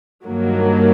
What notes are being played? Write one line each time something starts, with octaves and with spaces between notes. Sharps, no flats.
G2 D#3 F#3 A#3